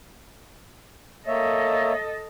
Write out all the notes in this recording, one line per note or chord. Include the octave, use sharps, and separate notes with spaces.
A#3 A4 C#5 D#5 E5